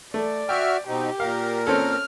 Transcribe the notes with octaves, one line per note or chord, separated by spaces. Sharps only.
A3 D5
F#4 E5 G5 F6
B2 C4 D#4 G4
A#2 A#4 F5
C4 C#4 A4 F6